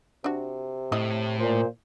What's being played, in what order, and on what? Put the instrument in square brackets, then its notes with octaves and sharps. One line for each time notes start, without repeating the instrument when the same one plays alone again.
[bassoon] C3 [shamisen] D4 F#4
[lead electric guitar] A2 [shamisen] E4 D#5
[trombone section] A#2 [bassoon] C5